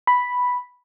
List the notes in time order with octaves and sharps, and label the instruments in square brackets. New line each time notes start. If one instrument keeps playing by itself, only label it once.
[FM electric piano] B5